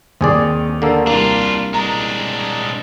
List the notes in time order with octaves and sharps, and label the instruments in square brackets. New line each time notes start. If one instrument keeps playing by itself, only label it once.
[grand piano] D#2 [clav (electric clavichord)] C4 G#4 D5
[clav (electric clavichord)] D3 A#3 A4
[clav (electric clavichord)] C2 A#3 [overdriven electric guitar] D4 F4
[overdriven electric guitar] G#3 D4 [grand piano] A#5